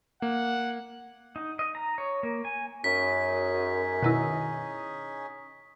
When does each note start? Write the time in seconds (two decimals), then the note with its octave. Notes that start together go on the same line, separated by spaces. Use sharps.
0.22 A#3 F#5
1.36 D#4
1.59 D#5
1.75 A#5
1.98 C#5
2.23 A#3
2.45 G#5
2.84 F#2 C#4 D#4 G#4 B6
4.03 B2 D#3 E4